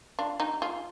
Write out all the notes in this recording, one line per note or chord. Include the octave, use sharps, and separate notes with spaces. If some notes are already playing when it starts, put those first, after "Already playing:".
D4 F4
D#4 G4
F4 G#4